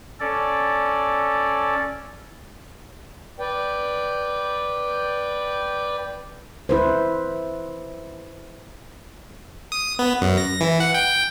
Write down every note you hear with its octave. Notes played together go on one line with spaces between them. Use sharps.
C#4 A4 D5
B4 D5 G5
E4 B4 C5
D#6
B3
F#2
A#6
E3
F#5
G5